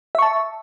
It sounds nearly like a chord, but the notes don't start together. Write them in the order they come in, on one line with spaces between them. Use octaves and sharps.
E5 C#6 A5